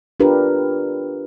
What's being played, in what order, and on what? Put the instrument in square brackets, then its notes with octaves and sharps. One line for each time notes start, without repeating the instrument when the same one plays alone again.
[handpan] D4 F4 G4 A#4 B4